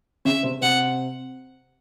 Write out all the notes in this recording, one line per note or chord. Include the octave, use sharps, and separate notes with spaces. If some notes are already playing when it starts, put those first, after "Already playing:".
C#3 C#4 E5
C3 C4
C3 C4 F#5